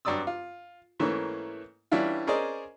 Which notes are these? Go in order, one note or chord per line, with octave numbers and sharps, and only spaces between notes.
G2 F#3 D5 D#6 E6
F4
G#2 E3 A3 A#3 C#4
E3 G3 C#4 D4 E4 F4
C#4 G#4 A#4 C5 D5 D#5